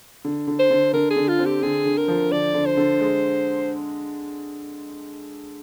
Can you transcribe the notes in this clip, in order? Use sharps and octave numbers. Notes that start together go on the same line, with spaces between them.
D3
D3
C5
D3
D3 A#4
G#4
D3
F4
C4
G4
D3 G#4
D3
A#4
F3
D3 D5
D3
C5
D3
G#3